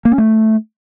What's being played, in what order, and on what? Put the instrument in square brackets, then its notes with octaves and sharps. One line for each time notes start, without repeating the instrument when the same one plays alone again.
[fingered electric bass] A#3
C#4
A3